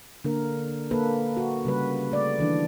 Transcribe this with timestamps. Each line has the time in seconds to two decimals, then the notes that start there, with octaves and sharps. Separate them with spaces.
0.25 D3 A#3 A#4
0.91 A#3 A4 B4
1.37 F#4
1.65 C#3 G3 B4
2.11 A3 D5
2.39 D#3 E3 D4